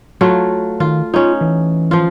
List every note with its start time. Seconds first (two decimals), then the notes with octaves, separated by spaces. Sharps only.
0.21 F#3 A3 F4
0.80 D#3 F4
1.14 C#4 D#4 F4
1.41 E3
1.91 F3 F4